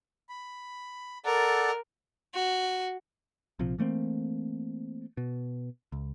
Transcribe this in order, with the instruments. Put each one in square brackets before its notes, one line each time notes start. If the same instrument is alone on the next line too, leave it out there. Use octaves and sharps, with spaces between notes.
[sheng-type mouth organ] B5
[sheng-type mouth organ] A4 D5 F#5 [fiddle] A#4
[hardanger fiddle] F#4
[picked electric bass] A#1 C3 F3
E3 A3 A#3 C4
B2
C#2